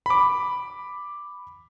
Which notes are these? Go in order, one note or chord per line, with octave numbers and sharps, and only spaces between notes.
B5 D6